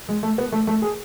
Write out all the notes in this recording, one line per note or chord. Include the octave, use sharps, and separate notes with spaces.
G#3
A3
B3
A3
A3
G#4